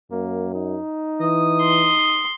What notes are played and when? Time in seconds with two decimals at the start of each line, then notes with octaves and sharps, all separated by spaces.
0.12 F#2 A#3
0.55 D#4
1.21 E3 D#6
1.61 C6